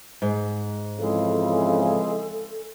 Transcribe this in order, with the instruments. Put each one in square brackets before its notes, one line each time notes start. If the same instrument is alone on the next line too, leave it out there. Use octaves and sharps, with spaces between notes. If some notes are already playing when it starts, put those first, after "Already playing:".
[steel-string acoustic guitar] G#2
[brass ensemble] F2 C#3 E3 [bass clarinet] G#3 [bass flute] A4